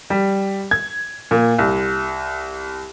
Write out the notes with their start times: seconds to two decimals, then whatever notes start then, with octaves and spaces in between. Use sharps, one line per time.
0.10 G3
0.71 G#6
1.31 A#2
1.59 C2